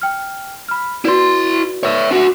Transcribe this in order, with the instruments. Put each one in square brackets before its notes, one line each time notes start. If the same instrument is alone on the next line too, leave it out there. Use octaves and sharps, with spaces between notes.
[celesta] G5 F6
B5 F6
[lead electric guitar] E4 C6 [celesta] F#4 B4 D5
[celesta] B4 D5 [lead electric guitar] C#5 E5
[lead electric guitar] D4 F#4